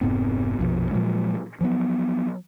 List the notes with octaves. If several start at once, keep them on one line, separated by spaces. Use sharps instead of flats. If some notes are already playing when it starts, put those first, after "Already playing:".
F1 G#2 B3 C4
A#1 F2 B2 F3
A#2 F3 F#3 G#3
F3 F#3 A#3 B3